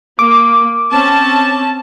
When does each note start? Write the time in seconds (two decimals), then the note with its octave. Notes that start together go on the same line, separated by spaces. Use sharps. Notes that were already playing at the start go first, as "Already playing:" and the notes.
0.19 A#3 D6
0.91 C4 C#4 A5